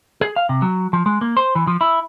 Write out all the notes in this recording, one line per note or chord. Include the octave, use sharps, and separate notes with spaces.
G#4
F5
C3
F#3
F3
G#3
A#3
C5
E3
F3
E4